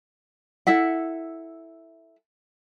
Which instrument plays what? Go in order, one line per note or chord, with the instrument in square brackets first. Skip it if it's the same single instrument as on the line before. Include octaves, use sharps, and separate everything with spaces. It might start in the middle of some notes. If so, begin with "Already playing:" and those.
[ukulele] E4 A4 E5 F#5